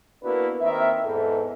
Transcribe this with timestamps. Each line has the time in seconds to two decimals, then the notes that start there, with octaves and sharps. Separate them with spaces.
0.23 A#3 B3 D4 E4 F#4 B4
0.61 D#3 A#3 C4 A#4 E5
1.05 E2 G#2 A4